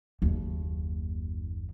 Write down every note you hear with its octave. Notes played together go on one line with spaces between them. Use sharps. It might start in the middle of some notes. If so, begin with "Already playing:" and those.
F#1 D#2